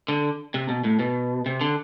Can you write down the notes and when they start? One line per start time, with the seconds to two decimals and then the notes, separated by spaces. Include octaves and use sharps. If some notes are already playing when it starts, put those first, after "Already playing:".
0.08 D3
0.54 C3
0.69 B2
0.84 A2
0.99 B2
1.46 C3
1.61 D3